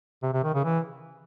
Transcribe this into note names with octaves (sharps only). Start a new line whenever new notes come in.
C3
C3
D#3
C#3
E3